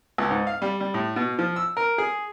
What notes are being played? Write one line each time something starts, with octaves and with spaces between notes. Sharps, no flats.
C#2
G#2
F5
G3
G3
A2
B2
F3
E6
A#4
G#4